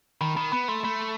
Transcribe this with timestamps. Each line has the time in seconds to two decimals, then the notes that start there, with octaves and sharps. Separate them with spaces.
0.21 D#3 B5
0.37 D#3 B5
0.52 B3 B5
0.68 A3 C6
0.84 A3 B5